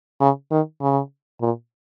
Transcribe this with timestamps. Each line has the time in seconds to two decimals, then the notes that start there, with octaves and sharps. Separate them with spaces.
0.21 C#3
0.51 D#3
0.81 C#3
1.41 A#2